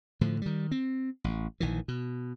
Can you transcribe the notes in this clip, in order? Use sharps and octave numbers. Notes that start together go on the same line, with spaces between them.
A2 D3 F3
D#3 G3
C4
A1
A#1 D#3 E3
B2